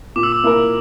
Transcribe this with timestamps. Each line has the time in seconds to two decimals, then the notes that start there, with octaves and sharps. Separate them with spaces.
0.16 A#2 D6
0.23 E6
0.32 D6
0.43 A#3 E4 A#4